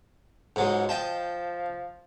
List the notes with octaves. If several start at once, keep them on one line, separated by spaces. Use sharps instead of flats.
C#2 G#2 F#3 G#3
F3 D#5 G5 A5